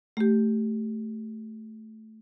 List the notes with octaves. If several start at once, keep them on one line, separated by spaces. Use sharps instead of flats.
A3 G4